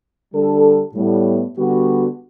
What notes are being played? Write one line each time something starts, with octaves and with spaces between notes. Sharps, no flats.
D3 G3 D4 A4
A2 G3 B3
D3 G3 B3 F#4